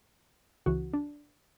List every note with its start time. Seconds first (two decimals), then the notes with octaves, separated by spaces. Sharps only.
0.66 C#2 C#3 E3 F#4
0.93 D4